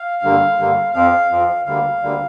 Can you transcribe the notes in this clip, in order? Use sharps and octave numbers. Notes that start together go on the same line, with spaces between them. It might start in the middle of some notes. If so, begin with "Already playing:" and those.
Already playing: F5
G2 D3 A#3
G2 D3 A#3
F2 F3 C4 F5
F2 F3 C4
D2 D3 G3 A#3 F5
D2 D3 G3 A#3